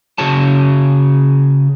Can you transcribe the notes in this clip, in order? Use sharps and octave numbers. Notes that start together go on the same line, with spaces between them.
C#3 F#4 G#4 C#5 A5